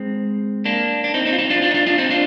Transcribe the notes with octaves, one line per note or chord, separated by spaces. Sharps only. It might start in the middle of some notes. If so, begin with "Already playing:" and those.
Already playing: G#3 C4
A#3 D4
D4
C4 D#4
C4 D#4
F4
C4 D#4
D4 F4
D4 F4
D#4
D4 F4
D4 F4
C4 D#4
D4 F4